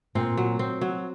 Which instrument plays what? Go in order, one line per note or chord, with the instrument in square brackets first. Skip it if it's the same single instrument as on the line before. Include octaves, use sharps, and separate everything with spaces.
[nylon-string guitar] A#2 [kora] C4
[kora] F#3
C4
F#3